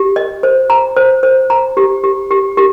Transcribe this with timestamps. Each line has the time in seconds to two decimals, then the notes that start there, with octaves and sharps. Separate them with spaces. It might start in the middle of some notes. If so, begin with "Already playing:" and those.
Already playing: G4
0.16 D#5
0.43 C5
0.70 A#5
0.96 C5
1.23 C5
1.50 A#5
1.77 G4
2.04 G4
2.31 G4
2.57 G4